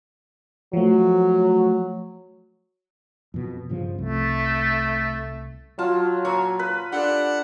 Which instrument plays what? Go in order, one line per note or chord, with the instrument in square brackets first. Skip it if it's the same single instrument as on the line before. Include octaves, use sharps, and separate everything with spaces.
[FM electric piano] F3 A3 [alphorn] F#3
[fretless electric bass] F2 B2
G2 C#3 F3
[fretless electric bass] C2 [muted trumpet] A3
[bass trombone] F#3 [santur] F4 [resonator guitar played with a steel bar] A5
[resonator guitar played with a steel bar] A#2 F#4 C#5
[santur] B4
[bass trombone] D4 [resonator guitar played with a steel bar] G4 A4 [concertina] F#5